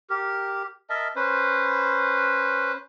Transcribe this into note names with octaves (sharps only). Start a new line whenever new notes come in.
G4 A#4
A#4 D#5 E5 A5
C#4 B4 C5